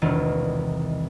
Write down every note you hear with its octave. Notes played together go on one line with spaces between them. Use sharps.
E1 C2 D#3 F4